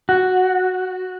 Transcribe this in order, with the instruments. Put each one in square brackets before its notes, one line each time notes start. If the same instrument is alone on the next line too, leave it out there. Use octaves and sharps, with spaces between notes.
[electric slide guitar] F#4